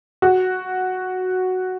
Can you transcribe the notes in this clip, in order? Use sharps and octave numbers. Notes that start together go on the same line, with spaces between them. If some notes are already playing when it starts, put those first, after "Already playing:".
F#4